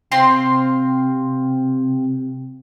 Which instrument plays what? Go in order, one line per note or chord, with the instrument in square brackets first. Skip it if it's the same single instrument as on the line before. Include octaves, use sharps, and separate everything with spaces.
[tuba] C3 [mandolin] C4 F4 C6